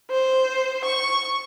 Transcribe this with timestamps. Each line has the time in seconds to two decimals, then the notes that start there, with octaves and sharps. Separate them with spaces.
0.11 C5
0.84 C#6